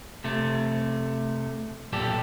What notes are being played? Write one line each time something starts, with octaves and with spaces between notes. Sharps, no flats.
C3 A3
B1 A#2 G3 G4 A4